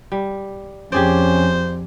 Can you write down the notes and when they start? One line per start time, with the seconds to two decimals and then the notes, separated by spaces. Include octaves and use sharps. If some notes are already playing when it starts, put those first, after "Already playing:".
0.12 G3
0.92 F2 C#4 G4 G#4 C5 D5